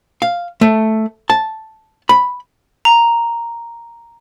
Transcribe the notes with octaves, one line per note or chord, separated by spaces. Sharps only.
F5
A3
A5
B5
A#5